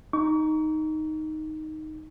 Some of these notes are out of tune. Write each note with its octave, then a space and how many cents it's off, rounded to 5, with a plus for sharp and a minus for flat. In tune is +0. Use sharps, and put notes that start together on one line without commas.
D#4 +0 C#6 +40